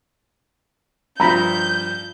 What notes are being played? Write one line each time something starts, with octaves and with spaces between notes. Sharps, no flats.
G2 F3 A#5 B5 G6